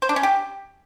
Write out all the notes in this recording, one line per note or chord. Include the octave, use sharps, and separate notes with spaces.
C5
D4
C#4
G4